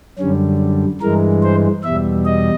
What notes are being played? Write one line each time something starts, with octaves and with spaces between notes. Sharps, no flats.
F#2 D3 G3 C#4
G2 E3 G#3 A#4
C5
E2 B2 G3 E5
D#5